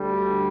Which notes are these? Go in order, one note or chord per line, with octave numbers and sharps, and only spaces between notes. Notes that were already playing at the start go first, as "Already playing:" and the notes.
Already playing: D2 D3 G3